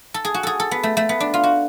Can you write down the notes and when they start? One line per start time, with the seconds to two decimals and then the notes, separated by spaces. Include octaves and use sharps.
0.14 A4
0.25 G#4
0.34 F#4
0.43 G#4 A4
0.60 A4
0.71 B3
0.83 A3
0.97 A3
1.09 B3
1.20 D4
1.34 F4
1.43 F#4